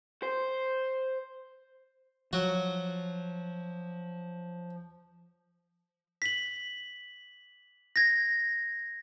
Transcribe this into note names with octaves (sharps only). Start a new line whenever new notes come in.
C5
F3 F#3 F#4
B6 F#7
G#6 A#6